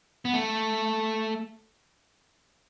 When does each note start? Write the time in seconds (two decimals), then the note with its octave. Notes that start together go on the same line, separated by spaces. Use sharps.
0.25 B3
0.34 A3